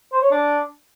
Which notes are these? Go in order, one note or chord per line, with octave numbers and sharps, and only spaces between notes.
C5
C#5
D4